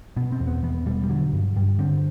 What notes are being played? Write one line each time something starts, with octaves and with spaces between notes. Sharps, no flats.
B2 B3
C4
E2
B3
E2 B3
B2 G3
G3
D3 F#3
G2
G2 G3
D3 C4